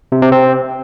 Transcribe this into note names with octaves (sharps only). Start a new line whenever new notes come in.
C3
C3
C4